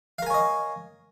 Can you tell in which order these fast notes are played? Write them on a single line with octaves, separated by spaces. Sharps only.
F5 A#4 G#5 C#5 D#5